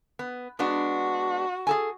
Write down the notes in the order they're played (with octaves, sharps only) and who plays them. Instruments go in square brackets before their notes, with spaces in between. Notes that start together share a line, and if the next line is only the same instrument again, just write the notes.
[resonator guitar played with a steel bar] B3
[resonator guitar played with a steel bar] G#3 B3 D4 [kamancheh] F#4
[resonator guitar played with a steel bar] G#4 A4 G#5